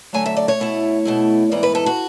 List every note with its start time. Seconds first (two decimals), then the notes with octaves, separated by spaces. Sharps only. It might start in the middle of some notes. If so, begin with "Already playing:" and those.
0.13 D3 F#3 A3 G#5
0.26 E5
0.37 D5
0.48 C#5
0.60 B2 A3 E4
1.05 B2 A3 E4
1.52 G#2 E3 B3 D5
1.63 B4
1.75 A4
1.86 F#4